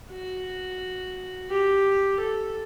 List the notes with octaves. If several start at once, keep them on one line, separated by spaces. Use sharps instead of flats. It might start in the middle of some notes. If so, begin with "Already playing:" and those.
F#4
G4
A4